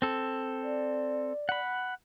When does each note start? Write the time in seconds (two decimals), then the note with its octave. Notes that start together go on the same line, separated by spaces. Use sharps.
0.02 C4 A4
0.63 D5
1.49 F#5 B5